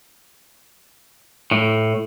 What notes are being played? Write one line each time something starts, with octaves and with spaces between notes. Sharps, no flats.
A2